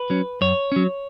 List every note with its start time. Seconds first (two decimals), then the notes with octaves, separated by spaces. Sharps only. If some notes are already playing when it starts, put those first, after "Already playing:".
Already playing: B4
0.10 F#3 C#4
0.41 F#2 C#5
0.72 F#3 C#4